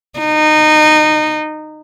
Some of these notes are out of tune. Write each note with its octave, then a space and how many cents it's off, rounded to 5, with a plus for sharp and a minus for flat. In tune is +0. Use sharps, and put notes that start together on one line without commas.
D#4 -20